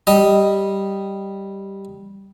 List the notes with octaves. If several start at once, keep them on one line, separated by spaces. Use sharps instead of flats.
G3 D#5